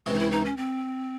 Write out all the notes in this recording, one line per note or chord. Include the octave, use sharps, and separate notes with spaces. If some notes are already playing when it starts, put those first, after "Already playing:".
C#2 C3 E3 G#3
D#4
E4
D#4
C#4
C4